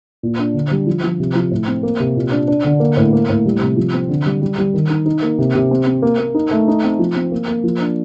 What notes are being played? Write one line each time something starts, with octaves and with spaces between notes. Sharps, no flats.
A#2
D4
D3
G3
F3
F3
C3
F3
A2
C4
A#3
C3
A#2
D4
D4
D3
A#3
A2
A#3
A2
G3
C3
F3
C4
D3
G3
G3
G3
D#3
D#4
D#4
A#3
C3
C3
C4
C4
A#3
A#3
D#4
A3
D#4
C4
F3
C4
A#3
A#3
F3
D4